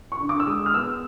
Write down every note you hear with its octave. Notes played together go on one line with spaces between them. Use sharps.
C#6
D3
D6
E6
G#3 D#6
F6
B3 E6